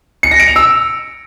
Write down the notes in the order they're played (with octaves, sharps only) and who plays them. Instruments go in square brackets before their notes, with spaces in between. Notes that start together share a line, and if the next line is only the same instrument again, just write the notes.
[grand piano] C#7
A#6
D7
F7
E6